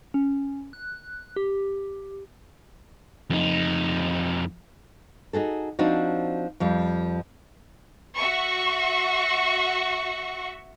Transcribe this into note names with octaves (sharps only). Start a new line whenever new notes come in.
C#4
F#6
G4
F2 D#4
D#4 F#4 G#4 A4
F3 C4 D4 D#4 F#4
F2 F3 G3
F#4 E5 C#6